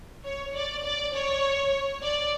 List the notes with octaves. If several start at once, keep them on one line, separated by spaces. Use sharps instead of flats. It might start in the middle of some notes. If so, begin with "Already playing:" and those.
C#5
D5
D5
C#5
D5